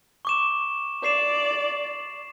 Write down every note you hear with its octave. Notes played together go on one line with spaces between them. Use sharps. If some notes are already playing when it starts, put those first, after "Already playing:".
C#6 D6 E7
D5 D6 C7 E7